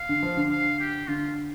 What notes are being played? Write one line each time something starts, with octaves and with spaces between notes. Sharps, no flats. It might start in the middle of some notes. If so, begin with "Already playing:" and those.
Already playing: F5
D3
F3
D3
F5
G4
D3 F4